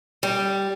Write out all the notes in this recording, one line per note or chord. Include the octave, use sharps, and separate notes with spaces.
G3